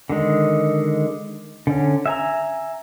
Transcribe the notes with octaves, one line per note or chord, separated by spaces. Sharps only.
D3 D#3 G#3
D3 C#4
E5 G#5 A#5